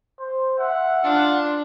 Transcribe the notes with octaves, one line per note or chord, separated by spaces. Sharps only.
C5
E5 F#5
D4 F4